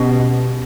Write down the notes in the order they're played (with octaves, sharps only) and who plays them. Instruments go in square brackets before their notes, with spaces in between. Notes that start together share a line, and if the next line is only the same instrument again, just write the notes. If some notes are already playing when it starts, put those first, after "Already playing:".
Already playing: [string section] B2 [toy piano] C#4 G4